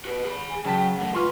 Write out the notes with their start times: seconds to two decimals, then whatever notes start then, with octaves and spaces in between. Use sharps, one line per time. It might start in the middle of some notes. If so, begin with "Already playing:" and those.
0.05 F#4 B4
0.24 G#4 B5
0.50 G#5
0.65 C#3 F#3 G5 A5 B6
0.97 F#2 A3 F#5
1.15 C#2 F4 B4 C6 C#6 F6